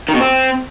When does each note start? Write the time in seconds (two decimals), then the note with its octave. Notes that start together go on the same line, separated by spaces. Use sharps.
0.09 D#3
0.14 B2
0.20 C4